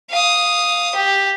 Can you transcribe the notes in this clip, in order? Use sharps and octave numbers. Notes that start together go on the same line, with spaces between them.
F5 D#6
G4